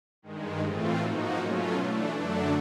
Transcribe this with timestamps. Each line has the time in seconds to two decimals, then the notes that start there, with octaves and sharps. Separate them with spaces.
0.22 G2 D#3 G#3
0.62 A2 E3 A3 C4 F4
1.00 G#2 F3 A#3 D#4 F#4
1.37 B2 F#3 A3 C#4 F4
1.75 E3 A3 D4
2.14 F#2 D3 F#3 A3 D4